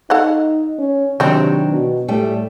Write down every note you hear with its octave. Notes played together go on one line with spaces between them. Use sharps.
D#4 A4 F5 F#5
C#4
C3 D#3 E3 F#3 C4 D4
B2
A2 G3 A3